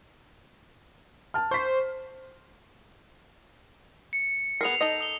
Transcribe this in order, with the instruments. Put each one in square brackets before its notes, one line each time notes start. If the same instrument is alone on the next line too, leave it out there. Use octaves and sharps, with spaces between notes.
[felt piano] A5 F6
[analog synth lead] C5 [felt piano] C#6 B6
[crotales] C#7
[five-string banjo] B3 G#4 A#4 [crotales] C7 F7
[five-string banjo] D#4 A4 D#5
[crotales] D#6 F7 G7